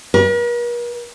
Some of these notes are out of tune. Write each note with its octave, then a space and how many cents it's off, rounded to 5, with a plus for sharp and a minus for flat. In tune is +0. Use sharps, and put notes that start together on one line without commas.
A#4 +45